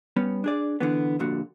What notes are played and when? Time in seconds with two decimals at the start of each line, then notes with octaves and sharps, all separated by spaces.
0.16 G3 B3 C#4
0.44 D4 G#4 D5
0.80 D3 E3 B3
1.19 C2 F2 A#2 D3 F#4